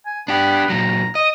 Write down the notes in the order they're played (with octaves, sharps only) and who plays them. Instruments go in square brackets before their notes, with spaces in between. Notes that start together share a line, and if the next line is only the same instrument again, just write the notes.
[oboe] G#5
[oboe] B3 [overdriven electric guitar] D4 G4
[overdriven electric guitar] A#2 F#3 [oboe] A#5
[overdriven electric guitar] D#5 [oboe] D#6